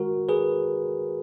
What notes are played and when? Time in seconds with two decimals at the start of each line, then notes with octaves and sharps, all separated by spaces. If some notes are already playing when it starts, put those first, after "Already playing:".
Already playing: D#3 G#3 F#4 A#4
0.29 G#4 B4